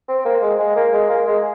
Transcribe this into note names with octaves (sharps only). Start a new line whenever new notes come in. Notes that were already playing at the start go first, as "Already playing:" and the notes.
C4
A#3
G#3
G#3
A#3
G#3
A#3
G#3